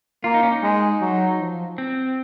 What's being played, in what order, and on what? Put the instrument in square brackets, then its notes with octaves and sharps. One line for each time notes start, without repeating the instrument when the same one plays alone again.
[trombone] A#3 [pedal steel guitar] F4
[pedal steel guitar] D#4
C#4
D#4
[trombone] G#3
F#3
F3
[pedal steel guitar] C4